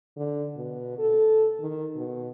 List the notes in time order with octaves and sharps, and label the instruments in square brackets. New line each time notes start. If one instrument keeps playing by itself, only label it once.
[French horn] D3
B2
A4
D#3
B2